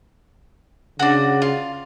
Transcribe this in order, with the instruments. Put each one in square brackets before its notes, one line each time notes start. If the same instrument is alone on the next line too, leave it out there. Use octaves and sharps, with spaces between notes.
[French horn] C#3 [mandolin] D4 F#4
[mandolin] F4